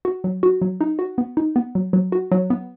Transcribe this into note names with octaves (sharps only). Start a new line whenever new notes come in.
F#4
F#3
F#4
F#3
D#4
F#4
B3
D#4
B3
F#3
F#3
F#4
F#3
B3